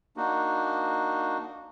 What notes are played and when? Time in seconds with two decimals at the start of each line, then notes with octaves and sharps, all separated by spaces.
0.17 A#3 D4 D#4 F#4